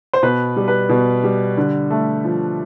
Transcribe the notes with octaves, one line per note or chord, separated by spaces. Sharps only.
C5
B2 B4
G3
B4
B2
G3
D3
A3
F3